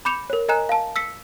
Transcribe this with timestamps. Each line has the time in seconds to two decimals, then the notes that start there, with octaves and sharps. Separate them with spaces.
0.05 B5 D6 G6 C#7 E7 F7
0.30 A#4 C#5
0.48 A#4 D#5 G#5 A#5 F#6 E7
0.69 F5 A5
0.96 E6 B6 C#7